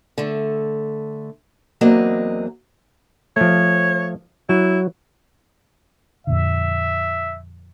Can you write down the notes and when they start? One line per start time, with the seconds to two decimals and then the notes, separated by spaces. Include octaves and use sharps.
0.18 D3 A3
1.81 E2 F#3 A#3 C4 D4 D#5
3.36 F3 A3 C#5
4.49 F#3 E4
6.27 F2 A#2 D3 E5